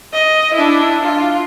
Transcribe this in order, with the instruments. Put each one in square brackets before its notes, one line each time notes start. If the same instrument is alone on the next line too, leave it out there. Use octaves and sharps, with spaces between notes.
[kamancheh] D#5
D4 E4
F4